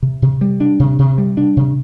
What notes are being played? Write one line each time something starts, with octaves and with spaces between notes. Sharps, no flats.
C3
C3
G3
D4
C3
C3
G3
D4
C3